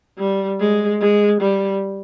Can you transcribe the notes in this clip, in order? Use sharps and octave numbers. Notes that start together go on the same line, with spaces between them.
G3
G#3
G#3
G3